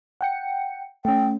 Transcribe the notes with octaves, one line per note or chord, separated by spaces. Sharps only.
F#5 G5 C#7
A3 C#4 G5